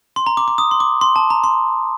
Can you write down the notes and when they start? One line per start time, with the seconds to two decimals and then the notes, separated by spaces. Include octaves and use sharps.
0.16 C6
0.27 A#5
0.37 D6
0.48 D6
0.58 D#6
0.71 C6
0.80 D6
1.01 C6
1.16 A5
1.30 A#5
1.44 C6